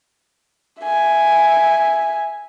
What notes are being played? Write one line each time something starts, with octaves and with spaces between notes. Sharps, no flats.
E5 G#5